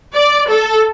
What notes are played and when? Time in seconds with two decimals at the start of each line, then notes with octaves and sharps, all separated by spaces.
0.13 D5
0.48 A4